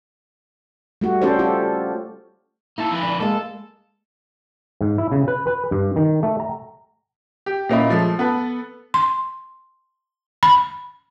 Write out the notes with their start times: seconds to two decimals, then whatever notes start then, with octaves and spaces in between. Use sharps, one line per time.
1.01 G3 A3 F#4
1.22 C#4 G4 A4 C5 D5
1.39 C#4 F4 G4 A4
2.78 A#3 E4 A4
2.91 F3 B4
3.03 D4
3.20 G#3 A#3 A4
4.81 G#2
4.98 E4
5.12 C#3
5.28 B4
5.47 B4
5.71 G2
5.96 D#3
6.23 A3
6.40 A#5
7.46 G4
7.69 A#2 A#3 C#4 E4 D#5 B5
7.90 F3 G#3 A3
8.19 B3 A4 B4
8.94 C6
10.43 B5